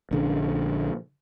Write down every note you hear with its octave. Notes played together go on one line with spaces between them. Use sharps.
A#1 D3 E3 C#4